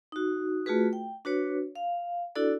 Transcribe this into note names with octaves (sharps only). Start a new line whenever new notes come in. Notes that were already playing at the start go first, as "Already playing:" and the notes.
D#4 F#4
A3 F4 F#4 G#4 B4
G5
D4 F#4 B4 C#5
F5
D4 E4 F#4 A4 D5